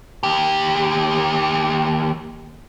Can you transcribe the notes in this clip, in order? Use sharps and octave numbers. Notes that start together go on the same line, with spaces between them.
D#2 G4